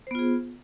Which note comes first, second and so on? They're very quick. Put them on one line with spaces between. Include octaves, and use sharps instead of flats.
C5 B3 F4 G#4